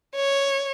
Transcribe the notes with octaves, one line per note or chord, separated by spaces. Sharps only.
C#5